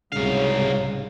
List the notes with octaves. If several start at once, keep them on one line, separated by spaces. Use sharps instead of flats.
C2 G#2 C#3 F#3 F5